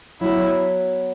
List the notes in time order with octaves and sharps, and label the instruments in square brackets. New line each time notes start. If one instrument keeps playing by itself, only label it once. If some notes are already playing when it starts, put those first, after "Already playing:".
[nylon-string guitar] F#3 B3 F#4 C#5 [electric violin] E4